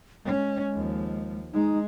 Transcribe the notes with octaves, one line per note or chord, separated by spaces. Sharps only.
G#3 C#4
D#2 F3
G#3 D#4